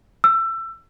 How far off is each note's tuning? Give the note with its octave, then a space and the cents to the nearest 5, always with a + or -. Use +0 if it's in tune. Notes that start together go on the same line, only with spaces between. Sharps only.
E6 +25